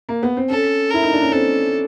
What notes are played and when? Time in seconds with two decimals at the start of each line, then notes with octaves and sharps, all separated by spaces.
0.09 A#3
0.23 B3
0.37 C4
0.50 C#4 A4
0.90 E4 A#4
1.03 D#4
1.13 D4
1.22 C#4
1.32 C4 A4